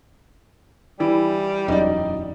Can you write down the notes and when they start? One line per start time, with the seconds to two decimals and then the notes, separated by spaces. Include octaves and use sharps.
1.00 E3 G3 E4
1.68 E1 F#2 D#4 D5